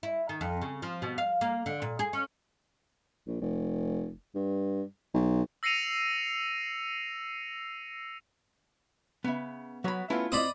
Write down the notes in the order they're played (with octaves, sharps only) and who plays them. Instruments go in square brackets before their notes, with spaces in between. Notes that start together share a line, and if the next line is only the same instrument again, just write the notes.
[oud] E4
D#3
F2
C#3
F3
B2
F5
A#3
D3
A#2
G#4
C#4
[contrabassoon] A#1
F1
G2
B1
[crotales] E6 A#6 C7 C#7 D#7 F7
[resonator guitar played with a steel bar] C#3 [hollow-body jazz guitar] B3 E5
[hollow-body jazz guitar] F#3 B5 [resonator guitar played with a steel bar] B3 F#4 C#5
[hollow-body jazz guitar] A3 B3 C#4 [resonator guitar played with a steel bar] E4 F4
[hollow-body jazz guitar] C4 D#5 [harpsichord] D5 B5 D#6